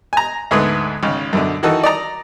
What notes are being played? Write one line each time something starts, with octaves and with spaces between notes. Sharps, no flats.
G#5 A#5
D2 G#2 G#3 A3 B3 D#6
G#1 C#3
F#2 B2 D3
D#3 E3 D#4 F#4 A4
D5 D#5 A#5